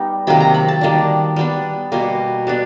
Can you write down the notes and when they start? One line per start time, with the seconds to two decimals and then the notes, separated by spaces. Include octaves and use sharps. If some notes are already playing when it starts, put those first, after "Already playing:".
Already playing: G3 B3 D#4
0.27 C3 D#3 F#3 A#3 B5
0.40 A#5
0.54 B5
0.68 A5
0.81 D#3 G3 A#3 D4
1.36 G3 B3 D4
1.92 B2 G3 A#3 G#5
2.47 G3 B3 D4